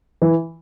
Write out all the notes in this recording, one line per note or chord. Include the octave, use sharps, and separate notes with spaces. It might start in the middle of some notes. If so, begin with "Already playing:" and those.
E3